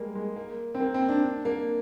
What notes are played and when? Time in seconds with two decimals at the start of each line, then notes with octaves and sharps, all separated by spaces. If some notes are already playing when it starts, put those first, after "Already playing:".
Already playing: G3 G#3 A#3
0.15 G#3
0.36 A#3
0.74 C4
0.80 A#3
0.94 C4
1.08 D4
1.24 D4
1.45 A#3